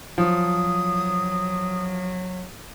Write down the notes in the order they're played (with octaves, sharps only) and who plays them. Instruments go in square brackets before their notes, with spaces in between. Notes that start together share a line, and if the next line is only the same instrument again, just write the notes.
[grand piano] F3 [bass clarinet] F#3 [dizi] D#6